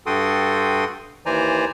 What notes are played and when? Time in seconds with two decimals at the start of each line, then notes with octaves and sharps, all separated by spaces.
0.06 G2 F#4 A4 G5 C6 D#6
1.26 D#2 E3 C5 D5 G#5 A#5